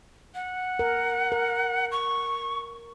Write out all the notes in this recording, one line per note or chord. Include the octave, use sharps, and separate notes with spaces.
F#5
A#4
A#4
C#6